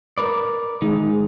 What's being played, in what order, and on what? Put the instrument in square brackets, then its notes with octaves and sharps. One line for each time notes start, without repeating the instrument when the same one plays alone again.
[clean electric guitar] A#4 B4 D5
[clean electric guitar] D#3 D#4 [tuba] G#3